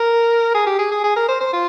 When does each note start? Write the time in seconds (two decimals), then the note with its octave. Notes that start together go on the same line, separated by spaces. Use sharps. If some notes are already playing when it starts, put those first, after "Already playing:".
Already playing: A#4
0.55 G#4
0.66 G4
0.79 G#4
0.91 G#4
1.04 G#4
1.16 A#4
1.28 C5
1.40 C5
1.53 F4